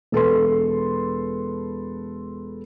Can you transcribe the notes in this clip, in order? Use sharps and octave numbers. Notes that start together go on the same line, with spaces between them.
E1 A4 B4 C6